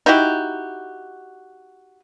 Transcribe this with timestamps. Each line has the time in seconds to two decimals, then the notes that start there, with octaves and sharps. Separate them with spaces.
0.06 D#4 E4 F#4 G4